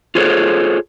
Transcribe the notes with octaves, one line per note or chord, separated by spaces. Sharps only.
F4 G#4 A4 C5 C#5